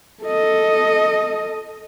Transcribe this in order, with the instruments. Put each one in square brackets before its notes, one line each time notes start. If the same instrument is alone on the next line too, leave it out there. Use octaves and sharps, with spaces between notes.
[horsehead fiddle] A4 D#5